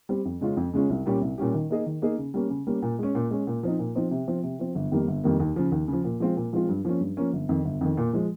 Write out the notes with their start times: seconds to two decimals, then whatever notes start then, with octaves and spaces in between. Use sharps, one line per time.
0.09 G3 C4
0.25 F2
0.41 C#3 G#3 C#4 F4
0.57 F2
0.74 C#3 G#3 C#4 F4
0.90 C2
1.06 A#2 G3 C#4 G4
1.21 C2
1.38 A#2 G3 C#4 G4
1.54 D#3
1.70 A#3 D#4 G#4 D#5
1.86 D#3
2.02 A#3 D#4 G#4 D#5
2.18 C#3
2.34 G3 A#3 C#4
2.50 C#3
2.67 G3 A#3 C#4
2.82 A#2
2.99 G#3 C#4
3.15 A#2
3.31 G#3 C#4
3.47 A#2
3.63 F3 C4 D#4
3.79 A#2
3.95 F3 C4 D#4
4.11 C3
4.28 F3 C4
4.43 C3
4.59 F3 C4
4.75 G1
4.92 F2 D#3 G3 A#3
5.07 G1
5.24 F2 D#3 G3 A#3
5.40 D#2
5.56 C#3 F3
5.72 D#2
5.88 C#3 F3
6.04 A#2
6.20 F3 G#3 C4 F4
6.36 A#2
6.53 F3 G#3 C4 F4
6.69 G2
6.85 F3 A#3 C#4
7.01 G2
7.17 F3 A#3 C#4
7.33 G1
7.49 F2 D#3
7.65 G1
7.81 F2 D#3
7.97 A#2
8.13 F3 G#3